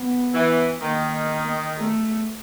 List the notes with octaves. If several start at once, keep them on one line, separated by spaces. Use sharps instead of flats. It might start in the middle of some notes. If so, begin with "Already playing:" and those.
Already playing: B3
E3
D#3 A#3
A3